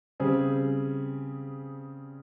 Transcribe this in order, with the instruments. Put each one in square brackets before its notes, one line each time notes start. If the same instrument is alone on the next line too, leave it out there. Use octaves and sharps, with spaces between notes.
[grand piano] C#3 G3 C4 G#4